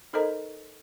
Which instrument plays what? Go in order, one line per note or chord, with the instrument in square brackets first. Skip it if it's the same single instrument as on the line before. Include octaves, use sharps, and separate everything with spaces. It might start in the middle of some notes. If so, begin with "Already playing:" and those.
[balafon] D#4 A4 A#4 C5 D#5 A#5